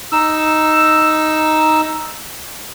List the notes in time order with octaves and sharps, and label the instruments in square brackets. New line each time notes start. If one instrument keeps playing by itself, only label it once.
[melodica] D#4 E6